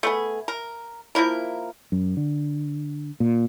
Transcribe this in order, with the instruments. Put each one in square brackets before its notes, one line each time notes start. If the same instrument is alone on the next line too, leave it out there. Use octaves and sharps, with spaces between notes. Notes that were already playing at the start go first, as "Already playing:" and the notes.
[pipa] A3 B3 G#4
A#4
F3 A#3 E4 A#4
[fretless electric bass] F#2
D3
A#2